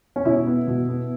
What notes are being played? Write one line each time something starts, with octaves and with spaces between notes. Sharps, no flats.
C#4
B2 E4
B3
B2
B3